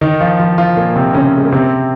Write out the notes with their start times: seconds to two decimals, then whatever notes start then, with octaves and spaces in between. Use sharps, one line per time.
0.01 D#3 D#4
0.20 F3 F4
0.40 F3 F4
0.58 F3 F4
0.77 A#2 A#3
0.96 C3 C4
1.14 C#3 C#4
1.38 G#3
1.45 A#3
1.52 C3 C4